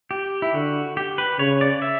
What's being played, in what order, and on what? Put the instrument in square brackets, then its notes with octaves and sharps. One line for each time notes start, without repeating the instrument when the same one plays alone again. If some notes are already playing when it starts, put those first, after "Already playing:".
[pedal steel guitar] G4
E4
[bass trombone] D3 [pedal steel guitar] F#4
[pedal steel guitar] G4
B4
[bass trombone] C#3 [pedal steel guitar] C#5
[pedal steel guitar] D5
E5